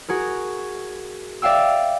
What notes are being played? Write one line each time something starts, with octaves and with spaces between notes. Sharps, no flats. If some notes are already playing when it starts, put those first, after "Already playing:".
F#4 G#4 A#4
D5 E5 F5 G5 E6